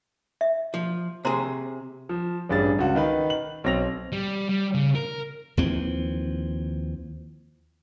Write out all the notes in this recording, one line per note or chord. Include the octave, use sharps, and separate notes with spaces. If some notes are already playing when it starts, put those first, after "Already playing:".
E5
F3
C3 G#4 C5 A#5 C6
F3
A1 G2 G#4 A6
C#2 F#4
D#3 D#4 B4
F#7
B1 C4 A#6 F7
G3
G3
C#3
A#4
D#2 E3 F3 C4